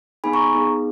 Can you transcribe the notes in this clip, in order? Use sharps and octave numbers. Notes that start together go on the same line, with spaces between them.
B3 D#4 G#4 G#5 B5
A#5 C#6
B3 D#4 G#4